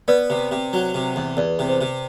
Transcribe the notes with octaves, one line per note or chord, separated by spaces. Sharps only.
B3 B4 D5
C3
C3
F#3
C3
E2
E2 B4 D5
C3
C5
C3